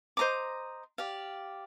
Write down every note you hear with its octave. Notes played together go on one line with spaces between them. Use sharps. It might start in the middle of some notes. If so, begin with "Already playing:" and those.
C5 D#5 A#5 D6
G4 D5 F5